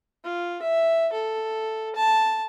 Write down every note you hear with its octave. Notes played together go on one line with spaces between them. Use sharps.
F4
E5
A4
A5